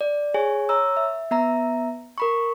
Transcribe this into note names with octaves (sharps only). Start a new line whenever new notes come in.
D5
G#4 C#5 G#5
C#5 A#5 E6
E5
B3 E5 A#5
A#4 B5 C#6